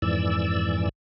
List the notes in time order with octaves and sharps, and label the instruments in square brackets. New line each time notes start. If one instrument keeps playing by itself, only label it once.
[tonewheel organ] F2 G#2 E3 D5 E6